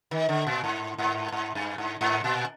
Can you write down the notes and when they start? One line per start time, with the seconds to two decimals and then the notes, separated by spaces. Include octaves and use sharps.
0.11 D#3
0.29 D3
0.47 A#2
0.64 G#2
0.98 G#2
1.32 G#2
1.55 G2
1.78 G#2
2.01 G#2
2.24 A#2